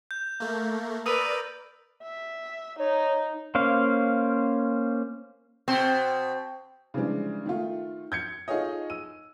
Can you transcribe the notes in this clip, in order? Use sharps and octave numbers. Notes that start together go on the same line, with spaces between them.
G6
A3 A#3
A#4 B4 D5 D#6 E6 D#7
E5
D#4 C#5
A#3 C#4 C5 F5
B2 C4 C5 G5
C#3 E3 F3 G3 G#3 D4
D#3 A3 F4
G6 G#6 C#7
D#4 F4 G#4 A4 C#5 D#5
E6 D#7